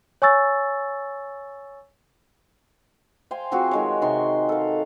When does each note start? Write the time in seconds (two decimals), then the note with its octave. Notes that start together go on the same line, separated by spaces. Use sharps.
0.22 C#5 G#5 C#6 E6 A6
3.31 C5 F5 G5 G#5
3.52 F3 C4 F#4 G#4
3.71 D#3 G#3 C#5
4.02 C3 D#4 C6 C#6
4.49 A4 F5